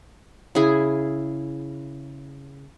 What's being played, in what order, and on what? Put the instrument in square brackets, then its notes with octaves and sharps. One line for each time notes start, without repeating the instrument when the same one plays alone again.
[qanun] C#3 E4 G#4